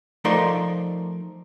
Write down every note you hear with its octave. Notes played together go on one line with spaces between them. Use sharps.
F3 A3 D#4 A#4 D5 C6